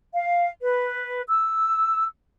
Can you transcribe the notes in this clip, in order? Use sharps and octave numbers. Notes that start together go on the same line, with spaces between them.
F5
B4
E6